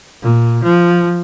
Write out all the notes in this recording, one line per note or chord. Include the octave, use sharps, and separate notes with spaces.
A#2
F3